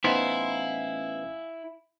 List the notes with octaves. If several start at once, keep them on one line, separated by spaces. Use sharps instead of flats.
A1 B3 D#4 E4 C5 F5 G#5